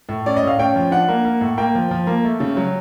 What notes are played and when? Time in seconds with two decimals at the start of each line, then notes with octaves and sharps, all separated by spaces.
0.09 A2
0.26 C#4 D5
0.37 D#5
0.43 A2 F5
0.59 C#4 G5
0.76 F3
0.91 D4 F#5
1.08 A#3
1.25 A#3
1.41 A2
1.58 A#3 G5
1.75 F3
1.91 F3
2.07 A#3
2.24 A3
2.40 C#3
2.57 F#3